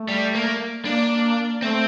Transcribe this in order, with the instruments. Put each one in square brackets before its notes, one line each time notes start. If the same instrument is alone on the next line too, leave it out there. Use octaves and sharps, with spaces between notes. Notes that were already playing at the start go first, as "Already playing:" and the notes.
Already playing: [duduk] A3
[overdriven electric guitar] G3
A#3
[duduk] A#3 [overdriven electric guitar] D4
[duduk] A3 [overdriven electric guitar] C4